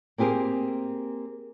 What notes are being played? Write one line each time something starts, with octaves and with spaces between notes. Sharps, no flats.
A#3 C4 G4 G#4 A#4